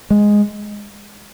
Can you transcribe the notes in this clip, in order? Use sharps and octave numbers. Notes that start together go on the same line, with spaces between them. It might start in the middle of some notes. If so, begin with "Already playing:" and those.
G#3